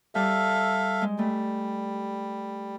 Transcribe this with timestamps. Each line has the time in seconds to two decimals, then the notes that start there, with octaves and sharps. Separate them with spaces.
0.15 G3 A4 E5 F5
1.02 G#3
1.19 G3 A3